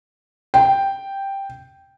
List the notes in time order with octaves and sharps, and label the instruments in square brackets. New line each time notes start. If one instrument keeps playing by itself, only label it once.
[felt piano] G5